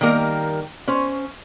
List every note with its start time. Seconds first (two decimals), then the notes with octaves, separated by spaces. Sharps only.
0.01 D#3 G3 A#3 A#4
0.88 C#4 C5